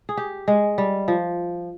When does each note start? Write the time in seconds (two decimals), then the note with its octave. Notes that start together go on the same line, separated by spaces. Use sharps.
0.09 G#4
0.17 G4
0.48 G#3
0.78 G3
1.08 F3